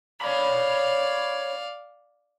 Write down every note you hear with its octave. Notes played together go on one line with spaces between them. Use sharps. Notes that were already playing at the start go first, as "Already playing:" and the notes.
C#5 D5 F5 B5